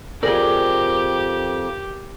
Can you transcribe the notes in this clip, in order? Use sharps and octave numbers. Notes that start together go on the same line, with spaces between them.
F2 G4 G#4 A#4 D5